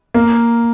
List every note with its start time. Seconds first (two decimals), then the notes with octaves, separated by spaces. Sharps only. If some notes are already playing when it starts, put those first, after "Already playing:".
0.14 A#3